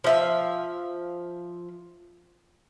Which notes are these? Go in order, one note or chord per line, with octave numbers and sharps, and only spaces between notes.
F3 E5 F5